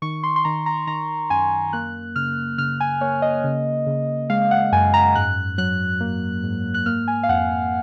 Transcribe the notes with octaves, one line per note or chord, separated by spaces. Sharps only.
D#3 C#6
C6
C6
D#3 A#5
A#5
D#3 A#5
F#2 G#5
A#3 F#6
C#3 F6
C#3 F6
G#5
A#3 C#5
D#5
C#3
C#3
G#3 F5
F#5
F#2 G#5
A#5
G#2 F#6
F#3 F#6
A#3
G#2
F#6
A#3 F6
G#5
F5
F2 F#5